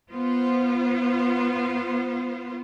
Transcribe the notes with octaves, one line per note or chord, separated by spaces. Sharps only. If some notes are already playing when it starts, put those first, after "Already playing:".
B3 F4 C5